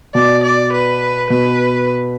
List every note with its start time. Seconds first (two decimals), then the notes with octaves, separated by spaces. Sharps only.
0.15 B2 D5
0.44 D5
0.73 B4
1.30 B2 B4